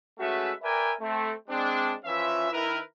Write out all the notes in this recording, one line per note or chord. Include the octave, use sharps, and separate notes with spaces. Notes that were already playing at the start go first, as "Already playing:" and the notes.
G#3 A3 C#4 F#4 B4 E5
A#4 B4 D5 E5 G5 G#5
A3 C4
G#3 C4 D4
E3 F3 C#4 F4 E5
D#3 E4 A#4 B4